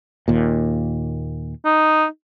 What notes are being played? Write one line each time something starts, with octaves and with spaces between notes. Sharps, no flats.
D#2 A#2
D#4